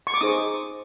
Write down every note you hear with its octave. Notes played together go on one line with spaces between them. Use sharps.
C#6
D6
D#4 G#4 C5 D#6